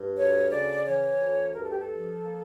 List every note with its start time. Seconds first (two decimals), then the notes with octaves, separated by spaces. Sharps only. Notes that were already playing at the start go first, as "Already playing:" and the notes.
Already playing: G2
0.17 D2 C#5
0.51 C#3 D5
0.86 E3 C#5
1.20 D2
1.54 G2 A#4
1.63 A4
1.72 G4
1.79 A4
1.90 F3
2.24 A#3